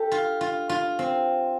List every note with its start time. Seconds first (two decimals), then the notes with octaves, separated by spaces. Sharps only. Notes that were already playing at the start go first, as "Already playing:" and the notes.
Already playing: G4 A4
0.12 F4
0.41 F4
0.69 F4
0.99 C4